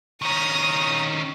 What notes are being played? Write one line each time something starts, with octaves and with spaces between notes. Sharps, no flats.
D#3 C#4 A#5 D#6